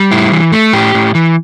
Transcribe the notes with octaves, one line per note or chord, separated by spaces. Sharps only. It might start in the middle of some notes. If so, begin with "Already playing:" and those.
Already playing: G3
A2 E4
E3
A3
A2 G4
A2
E3